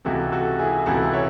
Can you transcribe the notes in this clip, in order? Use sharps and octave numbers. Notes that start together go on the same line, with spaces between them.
C#2 C3 E3 F#4 A4
F#4 A4
E4 G#4
C#2 C3 E3 F#4 A4
C#5 E5